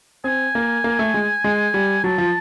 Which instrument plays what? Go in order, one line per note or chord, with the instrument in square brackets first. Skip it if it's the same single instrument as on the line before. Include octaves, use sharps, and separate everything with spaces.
[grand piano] C4 [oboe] G#5
[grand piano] A#3
A#3
A3
G#3
G#3
G3
[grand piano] F#3 [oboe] A5
[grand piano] F3